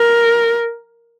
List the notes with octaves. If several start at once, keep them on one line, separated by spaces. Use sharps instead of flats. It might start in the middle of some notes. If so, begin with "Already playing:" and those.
Already playing: A#4